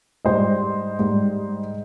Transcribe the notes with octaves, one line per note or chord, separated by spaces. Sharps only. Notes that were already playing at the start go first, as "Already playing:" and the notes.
G#2 G3 C5 D#5
G#2 G3